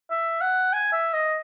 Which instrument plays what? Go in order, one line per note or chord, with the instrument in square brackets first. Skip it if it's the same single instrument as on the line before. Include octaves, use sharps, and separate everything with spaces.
[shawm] E5
F#5
G#5
E5
D#5